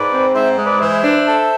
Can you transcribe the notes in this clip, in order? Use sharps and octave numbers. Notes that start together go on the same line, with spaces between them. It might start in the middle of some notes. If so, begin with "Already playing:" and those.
Already playing: G#2 B4 D5
C4
G#2 C5 E5
G#3
B4 D5
E3 C5 E5
D4
A4